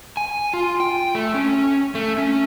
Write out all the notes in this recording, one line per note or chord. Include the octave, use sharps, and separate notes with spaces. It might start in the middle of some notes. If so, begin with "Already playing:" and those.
G#5
F4
G5
A3
C#4
A3
C#4